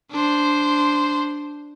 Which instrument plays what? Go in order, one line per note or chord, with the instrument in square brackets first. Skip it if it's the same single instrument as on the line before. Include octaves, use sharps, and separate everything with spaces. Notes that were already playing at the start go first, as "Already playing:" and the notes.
[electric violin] D4 C5